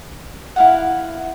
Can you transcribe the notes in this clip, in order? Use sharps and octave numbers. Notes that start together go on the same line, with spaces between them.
E4 F5 F#5